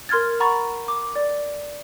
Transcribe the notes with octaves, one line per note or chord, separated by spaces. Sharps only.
A#4 C6 F6 G#6 A6
F#5 A#5 B5 C#6 A6
D6
D5